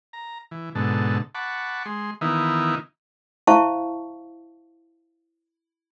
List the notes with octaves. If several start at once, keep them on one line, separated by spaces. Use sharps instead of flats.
A#5
E3
G#2 B2 D3 A4
F#5 A5 B5 C#6 D6
G#3 C6
D#3 E3 A#3 B3 D#4 E4
E4 C5 E5 F5 A5 C#6